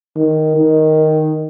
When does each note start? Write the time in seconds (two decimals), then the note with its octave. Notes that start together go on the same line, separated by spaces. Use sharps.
0.16 D#3
0.56 D#3